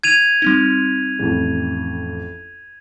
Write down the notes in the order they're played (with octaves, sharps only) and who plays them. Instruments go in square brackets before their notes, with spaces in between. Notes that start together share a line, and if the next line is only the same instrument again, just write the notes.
[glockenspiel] G#6 D#7 F7
[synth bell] G3 C4 D#4
[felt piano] A1 F2